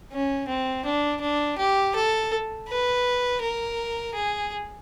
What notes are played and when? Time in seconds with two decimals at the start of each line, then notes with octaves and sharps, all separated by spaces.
0.13 C#4
0.48 C4
0.85 D4
1.21 D4
1.58 G4
1.95 A4
2.68 B4
3.41 A#4
4.14 G#4